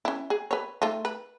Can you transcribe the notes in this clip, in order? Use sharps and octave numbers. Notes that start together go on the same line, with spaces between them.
C#4 E4
G#4
B4 C#5
A3 D#4 F4
B4